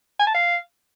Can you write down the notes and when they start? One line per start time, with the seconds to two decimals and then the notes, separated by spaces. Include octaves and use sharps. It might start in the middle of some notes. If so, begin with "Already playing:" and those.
0.20 G#5
0.27 A5
0.34 F5